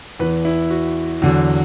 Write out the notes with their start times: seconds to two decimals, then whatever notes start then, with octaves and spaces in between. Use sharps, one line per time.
0.19 E2 E3 B4
0.45 E4
0.70 F#4
1.22 E2 D3 F#3